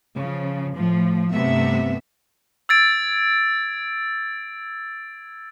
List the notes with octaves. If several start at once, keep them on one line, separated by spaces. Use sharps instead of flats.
C#3 F3
A2 F3
G2 C3 A3 B3 E5
E6 G#6 A6 D7